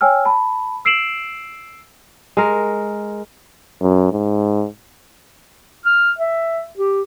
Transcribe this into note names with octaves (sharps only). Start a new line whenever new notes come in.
C#5 G5 G#5 E6 F6
A5 B5
E6 C7 D7 E7 F#7
G#3 A#4
F#2
G#2
F6
E5
G4